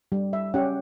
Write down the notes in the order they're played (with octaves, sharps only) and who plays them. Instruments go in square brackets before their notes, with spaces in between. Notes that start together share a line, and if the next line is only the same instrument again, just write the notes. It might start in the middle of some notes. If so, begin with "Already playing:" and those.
[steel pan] G3
E5
C#4 G4 F#5